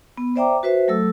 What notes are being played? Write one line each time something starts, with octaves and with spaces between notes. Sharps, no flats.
B3
C5 D5 E5 G5 A#5 D6
F#4 B4 C5 E5
F#3 A3 A4 E6